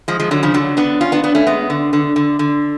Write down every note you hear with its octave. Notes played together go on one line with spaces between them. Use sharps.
F3 G#3
F3 G#3
D3 F#3
C#3 F3
D3 F#3
B3 D4
C#4 F4
B3 D4
B3 D4
A3 C#4
G#3 B3
D3
D3
D3
D3